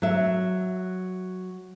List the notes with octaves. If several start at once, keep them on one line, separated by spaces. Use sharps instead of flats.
F#3 E5